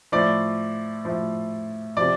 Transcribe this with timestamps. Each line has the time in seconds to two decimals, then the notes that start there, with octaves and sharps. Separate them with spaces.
0.12 A2 F3 D5
1.05 A2 F3
1.97 C3 F3 D5